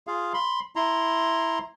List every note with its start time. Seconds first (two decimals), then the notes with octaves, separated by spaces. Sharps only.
0.07 F4 G#4 F5
0.34 B5 C6
0.76 E4 A#5 C6